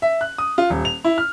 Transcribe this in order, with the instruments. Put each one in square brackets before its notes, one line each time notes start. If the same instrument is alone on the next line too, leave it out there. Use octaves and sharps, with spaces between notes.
[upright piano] E5
F#6
D#6
F4
D#1
F7
E4
F6